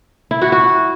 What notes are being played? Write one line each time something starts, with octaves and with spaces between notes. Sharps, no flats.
E4
F#4
F#4